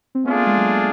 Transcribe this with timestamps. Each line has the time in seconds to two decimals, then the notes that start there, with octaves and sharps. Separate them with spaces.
0.15 C4
0.24 A3 B3 D4 F4 G#4
0.36 A#3
0.47 G#3
0.57 F#3